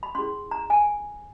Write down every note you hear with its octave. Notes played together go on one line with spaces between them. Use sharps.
B5
C#4 E4 G#4 C6
A#5
G#5